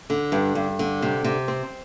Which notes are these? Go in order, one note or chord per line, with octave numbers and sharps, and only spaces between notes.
D3
G2
G2
D3
C3
C3
C4